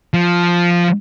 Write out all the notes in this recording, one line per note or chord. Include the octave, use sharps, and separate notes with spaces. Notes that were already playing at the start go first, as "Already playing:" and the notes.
F3